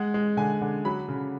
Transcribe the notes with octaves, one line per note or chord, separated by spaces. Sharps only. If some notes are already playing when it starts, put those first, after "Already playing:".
Already playing: G#3 F#5
G#3
D3 G#5
D3
F#3 B5
C#3